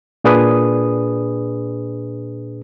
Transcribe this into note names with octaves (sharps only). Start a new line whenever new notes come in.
A#2 D4 G#4 B4 D#6